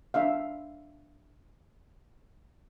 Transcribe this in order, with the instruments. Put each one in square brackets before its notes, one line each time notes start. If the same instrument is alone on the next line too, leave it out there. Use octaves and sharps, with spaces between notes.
[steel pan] D4 E5 F5